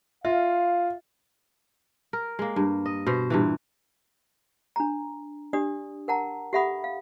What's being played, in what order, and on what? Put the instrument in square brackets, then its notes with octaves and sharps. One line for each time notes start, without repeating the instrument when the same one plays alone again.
[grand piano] F4 [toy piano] E5 [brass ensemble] F5
[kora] A#4
G#3 A#3
G2
D#5
B2 C5
G2 A#2 E3
[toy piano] D4 A#5
D4 G4 D5 D#6
A#4 F#5 A5 A#5
G4 A4 E5 F#5 B5 D#6
F5